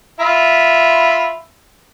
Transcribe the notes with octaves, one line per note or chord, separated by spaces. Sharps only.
F4 E5 B5